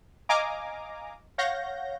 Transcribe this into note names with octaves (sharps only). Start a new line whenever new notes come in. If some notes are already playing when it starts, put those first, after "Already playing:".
D#5 F5 G#5 A#5 D6
C#5 F5 F#5 G6 A#6